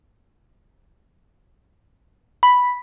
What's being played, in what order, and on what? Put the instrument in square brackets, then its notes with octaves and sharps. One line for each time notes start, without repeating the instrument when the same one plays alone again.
[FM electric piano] B5